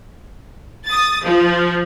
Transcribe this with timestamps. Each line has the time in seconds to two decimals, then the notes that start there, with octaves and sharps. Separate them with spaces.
0.87 D#6 A6
1.23 F3